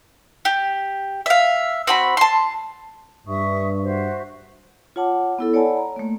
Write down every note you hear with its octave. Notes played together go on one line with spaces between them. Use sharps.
G4
E5 F5
C4 F#4 B5
A5 C6
G2 E5 C#6 D#6
F#4 C5 E5
F4 C#5 F#5 A5 D6
B3 E4 A4
C#5 D5 F#5 G#5 A5 B5
A#5
A3 A#3